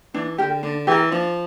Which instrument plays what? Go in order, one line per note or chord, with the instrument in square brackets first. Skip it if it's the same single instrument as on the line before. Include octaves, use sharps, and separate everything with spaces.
[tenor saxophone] E3 [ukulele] D4
[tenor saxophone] D3 [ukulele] G4 A#4
[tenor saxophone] D3 [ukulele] D4
[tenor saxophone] E3 [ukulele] G4 A#4
[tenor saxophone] F3 [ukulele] D4